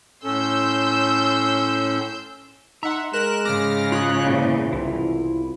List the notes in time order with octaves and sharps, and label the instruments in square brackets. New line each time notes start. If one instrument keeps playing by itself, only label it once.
[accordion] A2 C#4 A4 [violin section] C6 E6 G6
[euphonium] D#4 [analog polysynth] E5 F#5 [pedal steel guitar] A#5 C6
[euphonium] G#3 [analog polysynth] A#4 F#6 E7
[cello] G#2 C#3 [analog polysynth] D6 F6 A#6
[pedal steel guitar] F4 D#6 [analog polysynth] C#5 F#6
[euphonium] E2 [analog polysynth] A#2 [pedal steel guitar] D3 E4 C5
[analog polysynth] C2 [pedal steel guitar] E4 F4